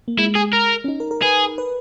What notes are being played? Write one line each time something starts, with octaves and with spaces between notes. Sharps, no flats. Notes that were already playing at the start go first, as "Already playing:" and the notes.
A#3
G#3 E4
G#4
A#4
C#4
D#4
A#4
A#4
G#4 B4
B4